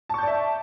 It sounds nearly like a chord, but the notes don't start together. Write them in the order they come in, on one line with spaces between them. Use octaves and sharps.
A5 C#6 G6 D5 E5